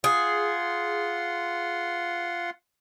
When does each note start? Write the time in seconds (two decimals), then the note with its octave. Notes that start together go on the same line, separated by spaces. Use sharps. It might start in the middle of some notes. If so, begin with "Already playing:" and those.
0.04 F4 G#4 F#5 C6